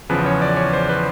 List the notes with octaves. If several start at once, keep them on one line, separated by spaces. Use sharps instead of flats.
E2 C#3 F3 B4
C#5
D5
C#5
C5
B4